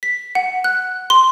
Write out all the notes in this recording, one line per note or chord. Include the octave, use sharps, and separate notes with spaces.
B6
F#5
F#6
C6